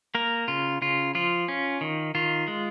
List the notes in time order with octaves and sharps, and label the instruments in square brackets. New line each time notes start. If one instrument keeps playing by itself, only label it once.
[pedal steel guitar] A#3 A#4
C#3 F4
C#3 F4
F3 F4
C#4
D#3
D#3 F4
G#3